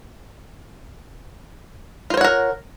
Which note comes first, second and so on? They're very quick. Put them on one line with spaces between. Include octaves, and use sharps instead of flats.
F4 C5 C#5 F#5 A#4